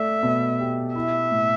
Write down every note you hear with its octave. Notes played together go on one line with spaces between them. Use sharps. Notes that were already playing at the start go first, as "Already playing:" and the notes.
Already playing: A3 D5 E5
B2
G4
E4 E5
A2